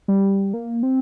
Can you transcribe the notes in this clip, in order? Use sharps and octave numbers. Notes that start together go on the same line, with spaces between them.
G3
A#3
C4